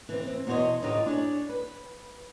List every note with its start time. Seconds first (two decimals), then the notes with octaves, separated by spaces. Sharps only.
0.09 E3 C4
0.27 C4
0.47 E2 B2 F#4 C5 C#5 D#5
0.82 D2 A2 D#4 F4 G4 D#5
1.06 D4 G#4 C#5
1.49 B4